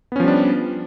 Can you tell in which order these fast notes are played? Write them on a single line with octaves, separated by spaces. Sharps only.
B3 C#4 F3 G3 D4